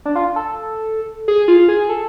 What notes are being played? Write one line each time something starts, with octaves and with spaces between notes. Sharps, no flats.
D4
F4
A4
G#4
F4
G#4
A4